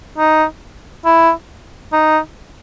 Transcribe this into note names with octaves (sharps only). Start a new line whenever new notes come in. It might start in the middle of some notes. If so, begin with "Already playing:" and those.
D#4
E4
D#4